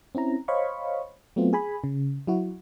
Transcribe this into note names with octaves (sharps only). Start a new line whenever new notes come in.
C4 C#4 E4 A#5
C5 C#5 D#5 F5 B5 C#6
F#3 A3 B3 C4 F4
G#4 G#5 B5
C#3
F#3 E4 F#4